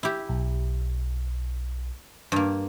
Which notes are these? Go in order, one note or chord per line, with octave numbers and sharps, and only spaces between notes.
E4 G4
B1
G2 A#3